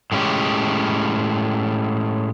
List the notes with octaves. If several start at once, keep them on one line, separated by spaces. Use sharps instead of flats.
A2 G#3 C#4 G4